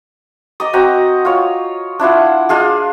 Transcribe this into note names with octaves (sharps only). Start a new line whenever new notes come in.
D5 D#5 A#5 D#6
C4 F#4 A#5
F4 C#5
D4 E4 F4 F#5
G#3 D4 F4 G#4